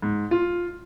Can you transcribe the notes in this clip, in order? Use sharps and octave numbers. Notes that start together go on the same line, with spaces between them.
G#2
F4